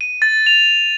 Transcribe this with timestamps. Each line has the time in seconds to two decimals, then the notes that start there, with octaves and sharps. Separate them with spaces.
0.01 D#7
0.22 A6
0.46 F7